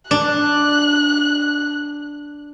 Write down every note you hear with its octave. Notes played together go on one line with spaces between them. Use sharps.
D4 F#6